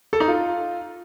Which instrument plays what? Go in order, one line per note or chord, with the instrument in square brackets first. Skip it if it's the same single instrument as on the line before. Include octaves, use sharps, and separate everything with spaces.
[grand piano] A4
D#4
F4